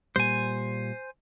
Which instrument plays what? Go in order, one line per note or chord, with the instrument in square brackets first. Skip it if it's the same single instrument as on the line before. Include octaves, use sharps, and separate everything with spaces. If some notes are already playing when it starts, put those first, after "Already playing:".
[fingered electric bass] A#2 G3 [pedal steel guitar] C5 G#5